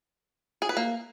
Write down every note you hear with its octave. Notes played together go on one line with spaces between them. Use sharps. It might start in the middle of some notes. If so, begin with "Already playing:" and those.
G#4
B4
A#3